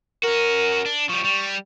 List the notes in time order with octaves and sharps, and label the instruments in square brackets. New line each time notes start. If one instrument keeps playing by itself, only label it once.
[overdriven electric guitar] C#4 F#4 [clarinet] A#4
[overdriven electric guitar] D4
[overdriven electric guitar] F3 G3 [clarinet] C#6
[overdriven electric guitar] G3